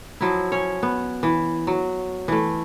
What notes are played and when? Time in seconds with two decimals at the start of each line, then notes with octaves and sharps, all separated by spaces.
0.21 F3 F#3 E4
0.52 C#4 C#5
0.83 B3
1.23 E3
1.67 F#3
2.28 E3 A3